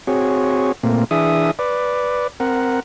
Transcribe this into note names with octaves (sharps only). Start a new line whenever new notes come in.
C4 F#4 G#4 C#5
A#2 A3 A#3 C4
E3 D4 G#4 E5 D#6
B4 D5
C4 A#4 F#5